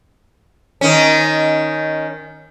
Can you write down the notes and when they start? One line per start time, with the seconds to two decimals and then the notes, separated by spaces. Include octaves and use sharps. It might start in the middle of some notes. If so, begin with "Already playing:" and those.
0.81 D#3 C#4